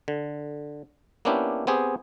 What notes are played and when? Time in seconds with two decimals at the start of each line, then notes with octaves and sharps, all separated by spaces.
0.08 D3
1.25 A#3 B3 C#4 D4 E4 G4
1.67 B3 C4 G4 G#4